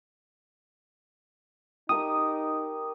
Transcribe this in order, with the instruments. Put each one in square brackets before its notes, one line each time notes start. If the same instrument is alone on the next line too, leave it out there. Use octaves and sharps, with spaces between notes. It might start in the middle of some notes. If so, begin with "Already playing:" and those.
[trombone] D#4 [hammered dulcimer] G4 A#4 [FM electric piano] D#6